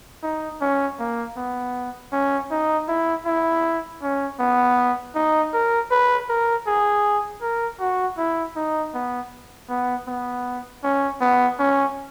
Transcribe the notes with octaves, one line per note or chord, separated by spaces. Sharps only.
D#4
C#4
A#3
B3
C#4
D#4
E4
E4
C#4
B3
D#4
A#4
B4
A#4
G#4
A#4
F#4
E4
D#4
B3
B3
B3
C#4
B3
C#4